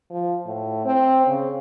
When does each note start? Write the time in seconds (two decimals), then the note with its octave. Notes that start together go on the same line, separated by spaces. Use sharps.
0.10 F3
0.46 A2
0.85 C4
1.27 C#3